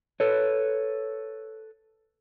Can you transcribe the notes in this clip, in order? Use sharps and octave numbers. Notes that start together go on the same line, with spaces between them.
A4 B4 C#5